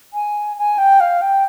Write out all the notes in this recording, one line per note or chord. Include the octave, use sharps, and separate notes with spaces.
G#5
G#5
G5
F5
G5